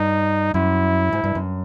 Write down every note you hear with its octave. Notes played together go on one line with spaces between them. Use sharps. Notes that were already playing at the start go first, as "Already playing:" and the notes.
Already playing: G2 D#4
F#2 E4
G#2
G2
F#2